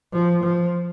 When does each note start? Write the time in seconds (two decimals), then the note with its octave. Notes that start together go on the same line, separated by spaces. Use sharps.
0.13 F3
0.44 F3